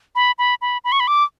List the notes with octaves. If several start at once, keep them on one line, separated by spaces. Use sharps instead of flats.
B5
B5
B5
B5
C#6
B5
D6